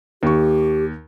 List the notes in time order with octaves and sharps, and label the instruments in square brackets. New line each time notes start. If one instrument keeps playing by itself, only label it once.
[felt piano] D#2 C#6 [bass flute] G4